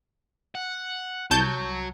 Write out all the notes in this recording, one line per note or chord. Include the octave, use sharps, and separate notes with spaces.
F#5
C2 F#3 A5 G6